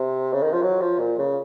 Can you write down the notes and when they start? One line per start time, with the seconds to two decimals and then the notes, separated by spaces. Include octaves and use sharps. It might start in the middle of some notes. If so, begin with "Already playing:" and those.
Already playing: C3
0.33 C#3
0.43 D#3
0.53 F3
0.63 F#3
0.81 F3
0.99 A#2
1.19 C#3